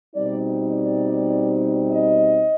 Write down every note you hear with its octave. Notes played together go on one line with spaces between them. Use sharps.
B2 G3 C4 D#4 D5
D5
D#5